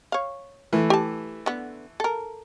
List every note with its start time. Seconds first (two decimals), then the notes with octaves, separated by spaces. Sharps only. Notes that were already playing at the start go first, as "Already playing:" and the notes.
0.12 C#5 F5
0.73 E3 A3
0.90 G4 A5
1.46 D3 B3
2.00 A4 A#4